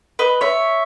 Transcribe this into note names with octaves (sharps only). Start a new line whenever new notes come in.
B4 D#5
C#5 E5